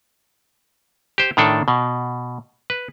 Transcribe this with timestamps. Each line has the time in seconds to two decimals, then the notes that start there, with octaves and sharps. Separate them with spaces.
1.18 G4 C5
1.37 A2 D#3 D4 A4
1.68 B2
2.70 B4